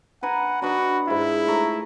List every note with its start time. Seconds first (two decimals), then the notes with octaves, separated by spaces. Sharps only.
0.23 B4 F#5 G#5 A#5
0.62 D4 D#4 F#4 B4
1.08 G#2 E4 F4
1.47 A3 A#5 C#6